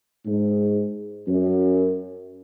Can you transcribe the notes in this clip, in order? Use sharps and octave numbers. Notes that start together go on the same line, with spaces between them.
G#2
F#2